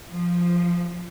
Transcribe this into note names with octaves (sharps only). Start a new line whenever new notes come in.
F3